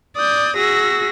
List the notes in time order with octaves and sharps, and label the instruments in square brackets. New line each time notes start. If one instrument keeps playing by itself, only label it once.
[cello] D5 [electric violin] D#6 G6
[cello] F#4 G#4 [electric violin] E6 A#6